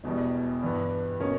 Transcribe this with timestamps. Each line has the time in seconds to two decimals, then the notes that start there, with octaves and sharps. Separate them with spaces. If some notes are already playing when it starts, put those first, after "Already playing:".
0.04 E1 E2 B2 G3
0.62 G2 E3 B3
1.20 B2 A#3 C#4